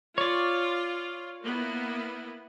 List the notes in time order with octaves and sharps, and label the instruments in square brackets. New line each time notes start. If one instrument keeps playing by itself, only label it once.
[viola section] F4 [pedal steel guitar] C#5 D5
[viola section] A#3 B3 E4